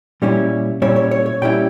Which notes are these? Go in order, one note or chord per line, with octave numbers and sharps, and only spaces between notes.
A#2 G3 C#4 E4
A#2 G3 C#4 E4 C#5
C#5
C#5
C#5
A#2 G3 C#4 E4 G5